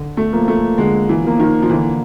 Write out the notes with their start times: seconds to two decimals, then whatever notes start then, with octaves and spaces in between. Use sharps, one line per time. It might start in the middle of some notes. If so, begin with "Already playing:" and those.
Already playing: D3
0.17 A3
0.32 F3 A#3
0.48 A3
0.78 D3 G#3
1.09 E3
1.24 F3 A#3
1.40 D#3
1.62 F3
1.70 D3 E3